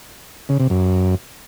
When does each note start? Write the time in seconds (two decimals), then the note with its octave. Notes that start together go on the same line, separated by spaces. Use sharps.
0.49 C#3
0.60 C3
0.70 F#2